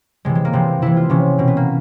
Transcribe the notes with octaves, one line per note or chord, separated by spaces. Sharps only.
C3 E3 G#3
G#3
A#3
C3 E3 C4
C3 E3 E4
F4
C3 E3 C#4
B2 C4
B3
A#3